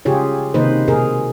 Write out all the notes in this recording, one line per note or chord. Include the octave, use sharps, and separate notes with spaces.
C#3 F4 G4 G#4 C#5
C3 D#3 A#3 D#4 B4 C5
B2 G#4 A#4